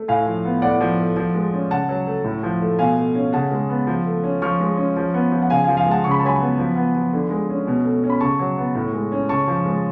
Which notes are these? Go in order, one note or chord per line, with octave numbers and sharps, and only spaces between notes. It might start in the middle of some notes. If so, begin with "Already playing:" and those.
Already playing: A3
A2 F5 G#5
F3
B3
A2 D5 F#5
F3
A3
F3
G#3
C#4
C#3 F#5 A5
F#3
A3
A2
F3
A3
B2 F5 G#5
A3
C#4
C#3 F#5 A5
G#3
B3
F3
A3
C#4
F3 C#6 F6
G#3
C#4
F3
B3
F3
F#5
C#3 F5 G#5
F5 G#5
F3
F5 G#5
G#3 F#5 A5
C#3 C#6
B5
A5
F#3 G#5 B5
B3
F3
B3
F3
D3
G#3
C#4
B2
A3
C#4
B5
C#3 A5 C#6
F#3
B3
A2
G#3
C#4
C#3 A5 C#6
F3
G#3